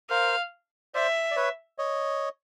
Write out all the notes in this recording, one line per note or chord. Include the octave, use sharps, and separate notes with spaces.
A#4 C5 F5
C5 D5 E5
D5
B4 C#5
C#5 D#5